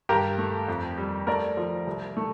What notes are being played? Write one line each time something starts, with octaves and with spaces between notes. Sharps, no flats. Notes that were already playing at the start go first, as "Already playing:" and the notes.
G2 G4 A#4
A3
F2
G3
A3 A#4 D5
F3
C2
A3